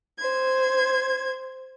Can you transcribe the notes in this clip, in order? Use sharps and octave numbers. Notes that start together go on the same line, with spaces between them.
C5 G#6